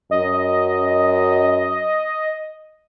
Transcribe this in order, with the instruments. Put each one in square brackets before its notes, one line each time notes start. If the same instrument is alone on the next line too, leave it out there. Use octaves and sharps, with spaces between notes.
[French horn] F#2 [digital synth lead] D#5